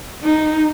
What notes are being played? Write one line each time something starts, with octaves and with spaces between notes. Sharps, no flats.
D#4